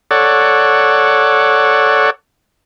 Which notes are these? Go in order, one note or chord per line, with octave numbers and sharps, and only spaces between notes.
A4 C#5 D5 F#5